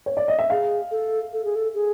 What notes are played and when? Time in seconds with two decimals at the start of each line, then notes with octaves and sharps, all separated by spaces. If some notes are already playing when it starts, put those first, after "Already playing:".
0.06 C#5
0.17 D5
0.28 D#5
0.39 E5
0.50 G#4 F5
0.91 A4
1.33 A4
1.44 G#4
1.55 A4
1.74 G#4